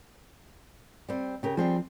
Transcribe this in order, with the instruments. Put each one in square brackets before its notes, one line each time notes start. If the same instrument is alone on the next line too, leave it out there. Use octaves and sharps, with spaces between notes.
[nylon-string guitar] G3 C4
C#3 G4 A#4
[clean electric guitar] F3 [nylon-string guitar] G3 C4 G#4